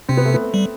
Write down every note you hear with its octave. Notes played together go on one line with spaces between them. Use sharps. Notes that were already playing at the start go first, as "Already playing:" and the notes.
C3 C4
B3
A3
B3
G3